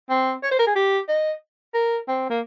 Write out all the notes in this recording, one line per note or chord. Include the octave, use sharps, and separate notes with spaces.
C4
C#5
C5
A#4
G#4
G4
D#5
A#4
C4
A#3